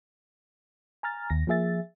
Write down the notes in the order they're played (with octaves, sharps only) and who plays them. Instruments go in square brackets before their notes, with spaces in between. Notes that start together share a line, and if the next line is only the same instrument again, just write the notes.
[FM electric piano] G#5 A#5 F6 A6
D#2 A#6
F3 A#3 G#4 E5 A6